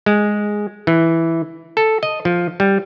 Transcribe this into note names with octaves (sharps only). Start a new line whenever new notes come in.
G#3
E3
A4
D#5
F3
G3